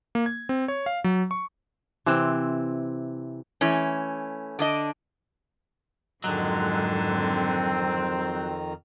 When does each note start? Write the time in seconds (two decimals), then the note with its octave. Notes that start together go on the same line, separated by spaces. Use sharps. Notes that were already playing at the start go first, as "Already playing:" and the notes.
0.15 A#3
0.26 G#6
0.49 C4
0.68 C#5
0.86 F5
1.04 F#3
1.31 C#6
2.06 C3 E3 C4
3.61 E3 A3 C#4
4.59 D3 D4 D#5
6.24 F2 G#2 D3 D#3 F#3 G#3 A#5
7.11 C4